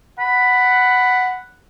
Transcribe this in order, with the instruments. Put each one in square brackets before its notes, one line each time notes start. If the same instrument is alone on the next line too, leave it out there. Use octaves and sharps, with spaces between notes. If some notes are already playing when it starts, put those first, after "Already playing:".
[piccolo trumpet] F#5 [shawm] B5